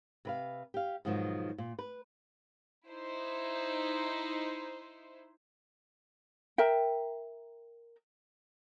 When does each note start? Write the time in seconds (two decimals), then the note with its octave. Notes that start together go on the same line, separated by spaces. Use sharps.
0.25 C3 B4 F5
0.74 G4 F5
1.05 G#2 B2 D#3 F3 F#3
1.58 A#2
1.79 B4
2.88 D#4 E4 C5
6.58 A#4 E5 G5